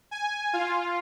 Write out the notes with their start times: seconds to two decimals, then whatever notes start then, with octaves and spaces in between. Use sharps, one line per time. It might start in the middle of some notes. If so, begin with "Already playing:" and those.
0.11 G#5
0.53 F4